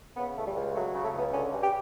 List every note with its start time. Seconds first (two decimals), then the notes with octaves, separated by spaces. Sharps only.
0.17 C#3 B3
0.37 C#2 A3
0.47 G3
0.56 C#2
0.75 F#3 A3
0.94 C#3
1.04 A3
1.14 C#2 B3
1.33 D3 C#4
1.53 G2
1.62 G4